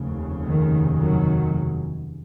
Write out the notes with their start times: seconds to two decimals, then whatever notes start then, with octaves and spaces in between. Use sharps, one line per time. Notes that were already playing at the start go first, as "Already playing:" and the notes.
Already playing: F1 D#2 C#3
0.44 D#3
0.99 D#3 F#3